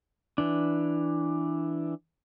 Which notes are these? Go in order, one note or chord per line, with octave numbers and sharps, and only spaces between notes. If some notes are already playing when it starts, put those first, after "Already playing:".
E3 D4